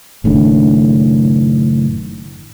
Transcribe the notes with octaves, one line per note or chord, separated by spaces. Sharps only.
F#1 A2 D#3 D4